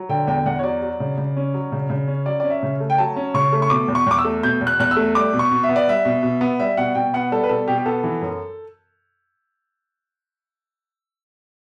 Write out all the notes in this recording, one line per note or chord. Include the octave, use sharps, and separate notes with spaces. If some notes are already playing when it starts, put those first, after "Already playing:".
Already playing: F#3
D3 G5
E2 G5
E2 F#5
C#5
F#3 D5
F#3
C#3
C#3
C#4
F#3
C#3
C#3
C#4
F#3 D5
C#4 D5
E5
C#3
A3
G5
F#3 A5
C#4
C#3 C#6
A3
C#6
B2 D6
E2
C#6
E2 D6
E6
A3
B2 G6
E2
F#6
E2 F#6
E6
A3
G3 D6
B2
C#6
B2
E5
B3
D5
G3 E5
B2
B2
B3
G3 E5
B2 F#5
B2 G5
B3 F#5
G3 A4
B4
B2 A4
B2 G4
G4
B3 A4
E3
F#2